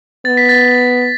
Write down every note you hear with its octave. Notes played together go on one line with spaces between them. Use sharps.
B3 A6
B6
A6